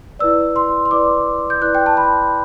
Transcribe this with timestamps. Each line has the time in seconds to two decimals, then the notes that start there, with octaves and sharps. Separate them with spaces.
0.19 E4 B4 D5 E6
0.56 C6
0.85 C6
0.91 E4 B4 D5 D6
1.50 G6
1.62 E4 B4 D5 F#6
1.75 G5
1.86 A5
1.97 B5